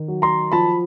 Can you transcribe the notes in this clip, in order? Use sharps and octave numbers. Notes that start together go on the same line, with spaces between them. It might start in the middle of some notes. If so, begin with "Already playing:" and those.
Already playing: D#3
F#3
A#5 C6
F3 A5 B5